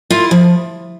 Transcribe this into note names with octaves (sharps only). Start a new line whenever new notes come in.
E4 F4
F3